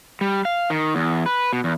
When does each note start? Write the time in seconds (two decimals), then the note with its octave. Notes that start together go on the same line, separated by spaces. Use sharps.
0.21 G3
0.45 F5
0.70 D#3
0.95 E2
1.26 B4
1.53 B2
1.64 E2